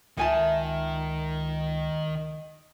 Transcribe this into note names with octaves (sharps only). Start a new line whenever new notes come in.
C#2 D#3 D#4 F4 A#4 E5 G#5 A5